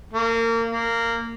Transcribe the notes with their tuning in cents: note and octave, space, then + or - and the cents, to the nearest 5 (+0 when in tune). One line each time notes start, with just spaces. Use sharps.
A#3 -30
A#3 -15